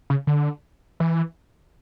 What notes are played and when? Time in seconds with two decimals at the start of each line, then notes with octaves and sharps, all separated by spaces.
0.10 C#3
0.27 D3
1.00 E3